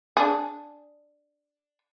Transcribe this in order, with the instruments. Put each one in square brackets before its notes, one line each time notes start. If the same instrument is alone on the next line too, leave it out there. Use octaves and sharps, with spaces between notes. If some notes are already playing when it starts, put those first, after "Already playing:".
[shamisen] D4 G#4